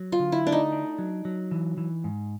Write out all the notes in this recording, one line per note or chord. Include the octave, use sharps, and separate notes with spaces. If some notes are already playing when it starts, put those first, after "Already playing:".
Already playing: F#3
F4
D3
E4
A3 D4
D#4
D4
F#3
F#3
E3
E3
G#2